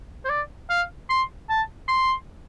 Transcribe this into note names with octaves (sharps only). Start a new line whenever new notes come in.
C5
D5
F5
C6
A5
C6